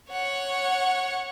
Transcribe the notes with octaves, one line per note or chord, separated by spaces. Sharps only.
C#5 F#5